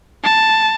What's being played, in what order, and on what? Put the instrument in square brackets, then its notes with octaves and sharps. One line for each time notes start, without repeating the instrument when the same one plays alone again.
[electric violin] A5